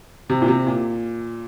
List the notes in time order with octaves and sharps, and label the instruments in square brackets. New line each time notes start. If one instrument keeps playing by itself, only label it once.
[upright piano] C3
A#2
C3
A#2